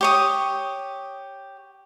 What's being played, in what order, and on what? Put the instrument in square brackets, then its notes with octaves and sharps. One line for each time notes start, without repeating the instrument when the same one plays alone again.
[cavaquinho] G4 C#5 D#6